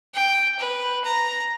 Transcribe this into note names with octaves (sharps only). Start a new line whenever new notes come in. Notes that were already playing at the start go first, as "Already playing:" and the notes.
G5
B4
A#5